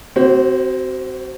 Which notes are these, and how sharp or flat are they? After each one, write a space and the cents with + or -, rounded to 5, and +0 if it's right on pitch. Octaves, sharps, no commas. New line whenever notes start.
C4 -10 F#4 +30 C5 +35